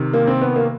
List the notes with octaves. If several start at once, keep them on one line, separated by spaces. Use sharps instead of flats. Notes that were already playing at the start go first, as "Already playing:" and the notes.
Already playing: C3 D#3
A#3
C4
B3
A#3